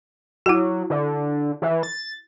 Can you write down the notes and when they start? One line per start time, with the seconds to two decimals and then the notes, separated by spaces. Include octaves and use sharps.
0.46 F#3 E4 F#4
0.90 D3
1.62 E3
1.83 A6